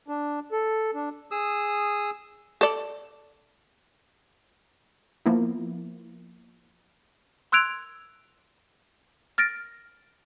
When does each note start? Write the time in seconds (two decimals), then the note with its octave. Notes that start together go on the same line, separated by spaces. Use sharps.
0.08 D4
0.52 A4
0.94 D4
1.31 G#4 D#6 E6
2.61 A4 D5
5.26 F3 A#3 B3 E4
7.52 C6 E6 F#6 G#6 D7 F7
9.38 F6 A6 A#6 D7